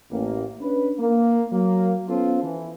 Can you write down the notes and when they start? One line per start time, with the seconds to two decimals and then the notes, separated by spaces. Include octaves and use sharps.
0.11 A1 A#3
0.60 C#4 D4 B4
0.99 A#3
1.51 F#3 A#3
2.09 B3 C#4 F4 A4 C5
2.43 E3